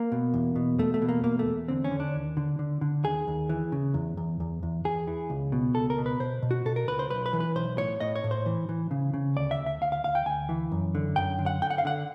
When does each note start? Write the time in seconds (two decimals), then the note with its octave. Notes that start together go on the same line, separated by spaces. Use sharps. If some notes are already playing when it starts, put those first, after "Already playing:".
Already playing: A#3
0.12 B2
0.34 E2
0.56 B2
0.79 E2 A3
0.94 A3
1.02 B2
1.09 A#3
1.24 E2 A#3
1.39 A3
1.46 E2
1.68 D3 C4
1.84 C#4
1.91 D3
2.00 D4
2.14 D#2
2.37 D3
2.59 D3
2.81 D3
3.04 D#2 G#4
3.28 D#2
3.49 E3
3.72 C#3
3.94 E2
4.17 E2
4.40 E2
4.63 E2
4.85 E2 G#4
5.08 E3
5.30 C#2
5.52 B2
5.75 C#2 A4
5.90 A#4
5.98 B2
6.06 B4
6.20 B2 C5
6.43 B2
6.51 F#4
6.65 B2 A4
6.76 A#4
6.88 C#2 B4
6.99 C5
7.10 B1 B4
7.26 B4
7.33 E3
7.40 B4
7.56 B1 C5
7.78 A2 C#5
8.00 A2 D#5
8.16 C#5
8.24 A2
8.31 C5
8.46 E3
8.69 E3
8.91 C#3
9.14 C#3
9.36 D2 D5
9.51 E5
9.59 D2
9.66 E5
9.81 D2 F5
9.92 F5
10.04 D2 F5
10.15 G5
10.26 D2 G#5
10.49 E3
10.72 F#2
10.95 D3
11.16 F#2 G5
11.39 D3
11.46 F#5
11.62 D3 G5
11.70 F#5
11.78 F5
11.85 D3 F#5